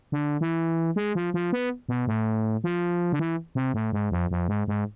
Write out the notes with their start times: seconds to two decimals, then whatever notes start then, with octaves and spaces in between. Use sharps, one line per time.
0.12 D3
0.41 E3
0.96 G#3
1.15 F3
1.34 F3
1.53 B3
1.89 B2
2.07 A2
2.64 F3
3.12 D3
3.19 E3
3.55 C3
3.74 A2
3.93 G#2
4.11 F2
4.31 F2
4.48 G#2
4.68 G#2